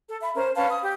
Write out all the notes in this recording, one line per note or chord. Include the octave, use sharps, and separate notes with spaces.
A4
E5 B5
C#4 A#4 C5
C#4 B4 F5 A5
D#6
G4